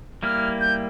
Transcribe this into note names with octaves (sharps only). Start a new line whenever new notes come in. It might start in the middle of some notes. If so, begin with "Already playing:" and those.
G3 A#3 E4 F6
G6